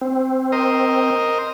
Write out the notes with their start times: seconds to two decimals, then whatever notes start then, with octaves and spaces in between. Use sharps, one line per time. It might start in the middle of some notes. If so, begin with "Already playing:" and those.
0.01 C4
0.52 A#4 C5 D#5